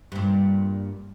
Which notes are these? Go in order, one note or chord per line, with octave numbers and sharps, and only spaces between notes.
G2 A#2